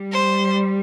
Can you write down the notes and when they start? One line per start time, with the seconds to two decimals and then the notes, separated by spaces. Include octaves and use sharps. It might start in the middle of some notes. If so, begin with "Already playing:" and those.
Already playing: G3
0.12 C5